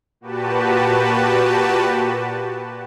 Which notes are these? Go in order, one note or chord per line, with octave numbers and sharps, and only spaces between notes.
A#2 F#4 G4 B4 A5